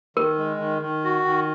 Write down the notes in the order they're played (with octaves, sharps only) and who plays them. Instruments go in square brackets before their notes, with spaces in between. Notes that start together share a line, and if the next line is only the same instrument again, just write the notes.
[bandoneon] D#3 [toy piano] A#4
[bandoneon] G#3
D#3
D#3
F#4
D#3